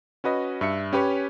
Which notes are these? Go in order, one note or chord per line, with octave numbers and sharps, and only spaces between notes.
C#4 F#4 B4 D#5
G2 E5 C#7
C#4 G4 B4 C#5